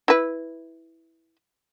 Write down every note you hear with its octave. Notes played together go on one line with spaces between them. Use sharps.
E4 B4